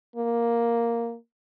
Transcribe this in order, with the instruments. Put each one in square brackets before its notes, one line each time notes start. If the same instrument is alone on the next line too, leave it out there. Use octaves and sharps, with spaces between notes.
[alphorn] A#3